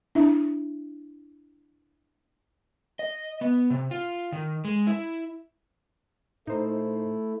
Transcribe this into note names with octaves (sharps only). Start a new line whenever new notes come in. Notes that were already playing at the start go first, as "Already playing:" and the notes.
D4 E4 E5
D#5
B3
C3
F4
D#3
G#3
E4
A#2 A3 D#4 E4 C5